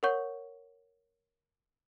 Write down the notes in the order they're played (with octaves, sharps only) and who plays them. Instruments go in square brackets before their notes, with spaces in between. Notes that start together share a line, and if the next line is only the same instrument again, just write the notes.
[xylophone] A#4 C#5 F#5 C#6 G6